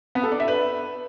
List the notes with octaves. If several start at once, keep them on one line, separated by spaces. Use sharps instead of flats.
B3
A4
D4
E5
B4